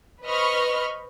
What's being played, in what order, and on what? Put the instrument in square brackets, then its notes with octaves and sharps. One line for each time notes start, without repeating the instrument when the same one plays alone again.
[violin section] B4 C5 D#5 B5 C#6 F6